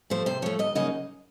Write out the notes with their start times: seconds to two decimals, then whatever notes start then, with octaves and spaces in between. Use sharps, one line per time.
0.10 F3 A3 C5
0.26 C3 C5
0.42 F3 A3 C#5
0.59 D2 D#5
0.75 C#3 F#3 A#3 D#4 D#5